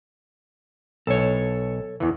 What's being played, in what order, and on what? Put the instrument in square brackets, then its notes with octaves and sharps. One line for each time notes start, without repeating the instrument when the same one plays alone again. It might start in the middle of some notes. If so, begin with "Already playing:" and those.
[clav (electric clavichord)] B1 [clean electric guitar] A4 C#5
[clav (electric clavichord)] E2 E3